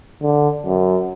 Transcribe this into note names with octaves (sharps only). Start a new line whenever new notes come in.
D3
F#2